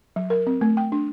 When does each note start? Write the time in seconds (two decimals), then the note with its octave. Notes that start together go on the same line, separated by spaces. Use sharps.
0.16 F#3
0.30 A#4
0.47 C4
0.61 A3
0.77 G5
0.92 D4